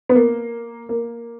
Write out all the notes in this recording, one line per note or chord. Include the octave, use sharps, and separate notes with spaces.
B3
A#3
A#3